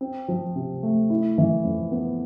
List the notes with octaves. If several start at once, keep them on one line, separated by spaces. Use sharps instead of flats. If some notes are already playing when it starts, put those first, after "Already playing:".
C4
F3
C3
A3
E4
E3
F2
B3